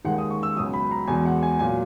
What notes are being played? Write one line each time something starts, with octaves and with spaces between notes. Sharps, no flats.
D#2 D#3 G#3 F#5
D#6
C#6
E6
C#2 B2 F#3 D#6
B5
A#5
E2 B2 G#3 G#5
F#5
G#5
A#2 F#3 G#5